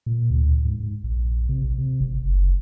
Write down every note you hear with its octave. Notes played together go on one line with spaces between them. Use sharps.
A#2
D2
G#2
G#2
A#1
C3
A#1
C3
G#1
F#1